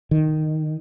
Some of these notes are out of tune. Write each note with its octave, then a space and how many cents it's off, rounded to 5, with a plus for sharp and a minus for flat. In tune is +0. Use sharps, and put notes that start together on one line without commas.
D#3 -5